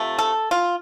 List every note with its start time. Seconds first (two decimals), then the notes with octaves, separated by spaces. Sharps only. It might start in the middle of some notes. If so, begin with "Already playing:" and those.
Already playing: C3 F3 A3
0.19 A4
0.51 F4